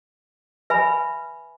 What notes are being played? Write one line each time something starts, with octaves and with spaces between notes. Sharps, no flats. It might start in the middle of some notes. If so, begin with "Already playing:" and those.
B4 E5 G#5 B5